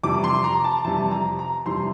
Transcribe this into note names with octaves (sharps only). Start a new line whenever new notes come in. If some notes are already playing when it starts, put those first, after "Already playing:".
F2 C3 E3 G3 D6
C6
A#5
A5
F2 C3 E3 G3 A5
A#5
A#5
F2 C3 E3 G3 C6